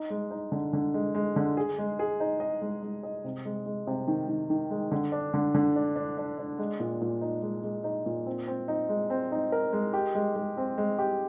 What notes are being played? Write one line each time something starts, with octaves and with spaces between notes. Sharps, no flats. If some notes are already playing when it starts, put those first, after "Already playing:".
Already playing: D#4
G#3
D#4
D3
D3
G#3
G#3
D3
G#4
G#3
G#4
D#4
D#5
G#3
G#3
D#5
C3
G#3
G#3
C3
D#3
D#3
D#3
G#3
D3
D4
D3
D3
D4
D4
D4
D4
G#3
A#2
A#2
D#4
G#3
G#3
D#4
A#2
C4
C4
D#4
G#3
C4
D#4
A#4
G#3
G4
G#3
G#3
C4
G#3
G4